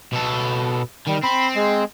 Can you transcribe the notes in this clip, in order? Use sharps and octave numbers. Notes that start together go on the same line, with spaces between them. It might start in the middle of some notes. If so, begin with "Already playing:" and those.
B2 A4
D#3 G3
C4 B5
G#3